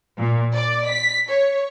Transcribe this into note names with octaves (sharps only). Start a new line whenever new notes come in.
A#2
D5
B6
C#5